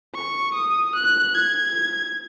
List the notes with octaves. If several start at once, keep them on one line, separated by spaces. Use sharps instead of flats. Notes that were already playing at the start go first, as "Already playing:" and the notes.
C#6
D#6
F#6
G#6